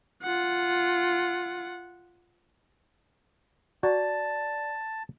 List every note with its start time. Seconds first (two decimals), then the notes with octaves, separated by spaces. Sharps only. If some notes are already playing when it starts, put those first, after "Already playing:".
0.23 F4 F#5
3.83 F#4 D5 A5 A#5